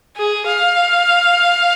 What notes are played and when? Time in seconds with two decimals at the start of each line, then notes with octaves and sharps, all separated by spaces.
0.17 G#4
0.47 F5